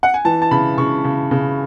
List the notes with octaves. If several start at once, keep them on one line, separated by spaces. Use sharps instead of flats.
F#5
G#5
E3 A5
A5
C#3 B5
C#3 C#6
C#3
C#3